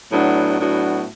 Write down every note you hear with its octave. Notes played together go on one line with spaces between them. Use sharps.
A2 F#3 B3 D4 F#4
A2 F#3 B3 D4 F#4